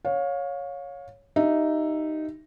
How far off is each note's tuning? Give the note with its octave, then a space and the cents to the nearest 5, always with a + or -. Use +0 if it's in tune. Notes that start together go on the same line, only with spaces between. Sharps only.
C#5 +0 F5 +25
D#4 -5 G4 -25 E5 +0